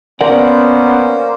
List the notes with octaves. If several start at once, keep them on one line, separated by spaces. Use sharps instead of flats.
A#3 B3 C#4 A#4 C5 D5 F#5